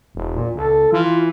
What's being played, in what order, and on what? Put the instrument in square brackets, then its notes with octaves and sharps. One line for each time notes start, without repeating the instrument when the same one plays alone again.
[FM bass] E1
[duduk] A#2
[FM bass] C#2 [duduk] A4
[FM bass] E3 [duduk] F4